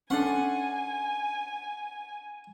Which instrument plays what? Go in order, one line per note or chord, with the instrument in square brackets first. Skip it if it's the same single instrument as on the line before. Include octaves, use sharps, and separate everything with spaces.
[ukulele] C#4 D4 A4 [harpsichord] F#5 C6 [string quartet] G#5